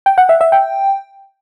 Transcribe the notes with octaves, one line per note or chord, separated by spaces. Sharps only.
G5
F#5
E5
E5
G5